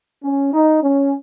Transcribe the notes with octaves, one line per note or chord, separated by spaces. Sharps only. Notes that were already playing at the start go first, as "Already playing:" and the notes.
C#4
D#4
C#4